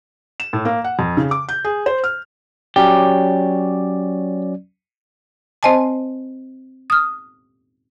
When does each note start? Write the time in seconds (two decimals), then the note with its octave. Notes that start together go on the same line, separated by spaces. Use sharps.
0.40 E7
0.53 A2
0.65 A#3
0.84 F#5
0.99 F2
1.17 C#3
1.31 D6
1.49 G6
1.65 G#4
1.86 C5
2.04 F6
2.76 F#3 C#4 G4 D5
5.63 C4 C5 D#5 G#5 A5
6.90 D#6 F6